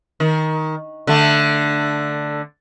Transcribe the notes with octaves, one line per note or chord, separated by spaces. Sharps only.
D#3
D3 A3